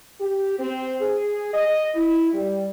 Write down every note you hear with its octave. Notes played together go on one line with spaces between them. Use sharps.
G4
C4
G#4
D#5
E4
G3